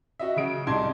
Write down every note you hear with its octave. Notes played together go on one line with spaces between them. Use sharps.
F#4 D#5 E5
C#3 F#3 D#6 D7
C2 G#2 D#4 A5 C6 G#6